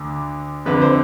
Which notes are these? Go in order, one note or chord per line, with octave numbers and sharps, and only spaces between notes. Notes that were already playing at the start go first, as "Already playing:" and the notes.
Already playing: D2 D3
F2 D3 B4
C5